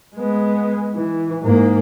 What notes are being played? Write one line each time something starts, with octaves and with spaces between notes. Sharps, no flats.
G#3 B3
E3
G#2 A#3